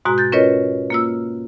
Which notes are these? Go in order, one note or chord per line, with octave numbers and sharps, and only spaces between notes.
G#2 B2 G#3 F#4 A#5
G6 A6
C#4 F4 A#4 B4 C#5 D#5
A#3 F4 E6